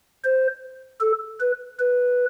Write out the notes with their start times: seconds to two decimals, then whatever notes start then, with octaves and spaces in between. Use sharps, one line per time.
0.24 C5
1.01 A4
1.40 B4
1.79 B4